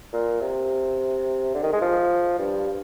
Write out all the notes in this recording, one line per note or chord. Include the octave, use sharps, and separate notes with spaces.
A#2
C3
D3
D#3
G#3
F3
G2